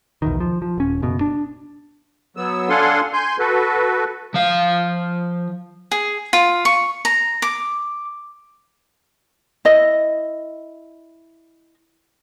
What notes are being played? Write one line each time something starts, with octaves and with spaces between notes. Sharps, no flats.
B1 E2 D#3
F3
F3
D#1 C#4
F#1 B2
D4
F#3 B3 E6
D4 A4 F5 F#5 G#5 C6
G#5 C6 G6
F#4 A4 B4
F3 F5
G#4
F4
C#6
A#5
D6
E4 D#5